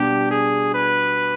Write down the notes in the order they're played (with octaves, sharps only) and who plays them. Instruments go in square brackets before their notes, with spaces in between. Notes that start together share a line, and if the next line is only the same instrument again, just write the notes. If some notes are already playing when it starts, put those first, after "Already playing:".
Already playing: [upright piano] B2 G3 D4 [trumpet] G4
[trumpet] G#4
B4